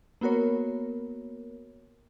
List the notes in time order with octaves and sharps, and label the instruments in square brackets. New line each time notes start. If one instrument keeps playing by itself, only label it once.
[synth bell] A#3 B3 F#4 A#4 C#5